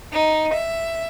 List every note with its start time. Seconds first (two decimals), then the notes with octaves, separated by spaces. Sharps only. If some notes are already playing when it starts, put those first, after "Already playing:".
0.13 D#4
0.54 E5